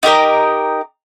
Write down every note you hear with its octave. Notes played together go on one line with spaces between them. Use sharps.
D#4 G4 A#4 D#5